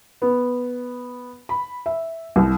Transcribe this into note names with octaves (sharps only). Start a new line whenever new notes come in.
B3
B5
E5
C2